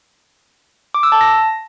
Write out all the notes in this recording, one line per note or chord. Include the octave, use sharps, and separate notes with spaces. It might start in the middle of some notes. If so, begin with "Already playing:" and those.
D6
E6
A5
A#6